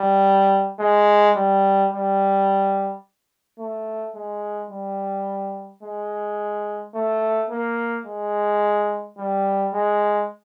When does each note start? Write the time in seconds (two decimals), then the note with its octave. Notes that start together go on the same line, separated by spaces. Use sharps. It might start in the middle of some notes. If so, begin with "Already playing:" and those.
Already playing: G3
0.80 G#3
1.36 G3
1.92 G3
3.59 A3
4.15 G#3
4.70 G3
5.83 G#3
6.95 A3
7.50 A#3
8.06 G#3
9.18 G3
9.74 G#3